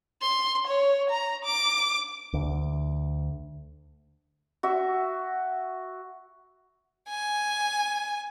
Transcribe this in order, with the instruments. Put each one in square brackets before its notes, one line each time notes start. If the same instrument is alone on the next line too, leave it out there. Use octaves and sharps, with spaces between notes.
[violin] C6
C#5
A#5
D6
[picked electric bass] D2
[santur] F#4 E5
[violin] G#5